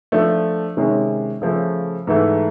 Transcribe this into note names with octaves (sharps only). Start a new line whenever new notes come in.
F3 A3 D4
C3 D#3 G#3 C#4
C#3 F3 A3
G#2 E3 A3